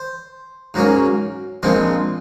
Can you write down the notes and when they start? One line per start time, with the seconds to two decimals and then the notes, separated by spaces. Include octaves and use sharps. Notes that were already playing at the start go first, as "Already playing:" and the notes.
Already playing: C5
0.74 G#2 F#3 A#3 C#4
1.63 A#1 A#2 G#3 C4